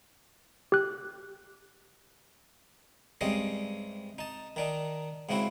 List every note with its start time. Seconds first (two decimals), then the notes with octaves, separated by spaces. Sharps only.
0.72 G4 F#6
3.21 G2 C3 G#3 C4 C#4 D#5
4.18 D#4 A5
4.56 D#3 D4 D#4
5.29 G#2 C#3 C4 E4 F#4